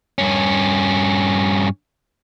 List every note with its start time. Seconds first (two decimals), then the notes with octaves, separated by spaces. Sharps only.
0.18 G2 C#4